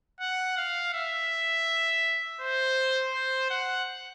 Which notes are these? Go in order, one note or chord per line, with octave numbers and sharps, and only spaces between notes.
F#5
F5
E5
C5
C5
F#5